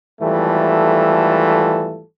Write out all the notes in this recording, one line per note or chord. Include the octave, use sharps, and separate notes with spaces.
G#1 E3 G3 A3 F4 A4